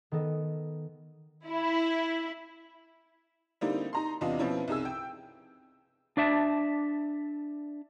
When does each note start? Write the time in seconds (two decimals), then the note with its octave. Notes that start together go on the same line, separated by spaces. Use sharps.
0.11 D#3 B3 A4 D#5
1.47 E4
3.61 D3 G3 A#3 C4 D#4 E4
3.93 D#4 A#5 C6
4.21 E2 C3 D4 F4 D#5
4.39 B2 F3 C4 C#4 E4
4.68 C2 D#4 G#4 E6
4.85 G5
6.17 D4 D5 E5 A5